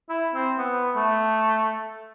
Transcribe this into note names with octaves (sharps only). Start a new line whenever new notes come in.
E4
C4
B3
A3